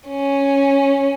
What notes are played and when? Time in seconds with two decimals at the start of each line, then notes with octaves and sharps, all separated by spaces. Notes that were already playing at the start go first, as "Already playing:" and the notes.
0.08 C#4